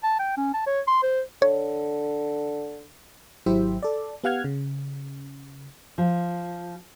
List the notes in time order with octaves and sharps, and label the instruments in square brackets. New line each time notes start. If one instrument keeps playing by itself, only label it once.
[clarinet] A5
G5
C#4
A5
C#5
C6
C5
[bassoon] D3 [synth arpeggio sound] C#5
[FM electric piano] G#1 F#3 E4 G4 C5 E5
A4 D5
B3 G4 F5 F#5 F6 G#6
C#3
[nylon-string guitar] F3